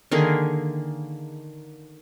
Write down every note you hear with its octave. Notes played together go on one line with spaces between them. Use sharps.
D3 D#3 A#3 G#4